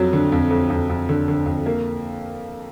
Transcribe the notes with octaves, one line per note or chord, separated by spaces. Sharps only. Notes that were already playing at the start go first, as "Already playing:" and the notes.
Already playing: F2 F#3
D3
F2
F2
F2
F2
D3
D3
F2
A#3